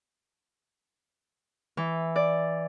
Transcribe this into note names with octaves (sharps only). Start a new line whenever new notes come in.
E3
D5